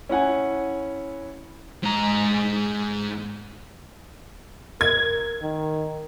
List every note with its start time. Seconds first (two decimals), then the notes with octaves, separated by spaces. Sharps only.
0.09 C#4 E4 F#5 G#5
1.83 G#2 A#5
4.81 A#4 G#6
5.42 D#3